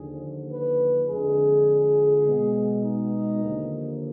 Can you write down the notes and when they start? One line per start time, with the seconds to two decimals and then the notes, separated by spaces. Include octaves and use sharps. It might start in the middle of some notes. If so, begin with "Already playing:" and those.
Already playing: D#2 D3 F3 G#4
0.52 B4
1.09 F2 D3 G#3 G#4
2.26 B2 G#3 B3
2.83 D#4
3.42 D#2 D3 F3 A#3